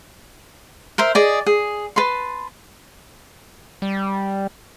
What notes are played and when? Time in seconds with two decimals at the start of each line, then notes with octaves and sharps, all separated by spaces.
0.98 A#4 C5 E5
1.15 G#4 D5 D#5
1.46 G#4
1.96 B4 A5 C6
3.82 G3